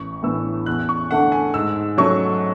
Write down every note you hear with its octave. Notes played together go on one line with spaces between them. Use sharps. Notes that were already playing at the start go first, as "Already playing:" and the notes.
Already playing: A1 C#6
A2 E3 B3 D4 E6
E2 F#6
C#6
D3 A3 D4 F#5
G#5
G#2 E6
F#3 A3 C#4 C#6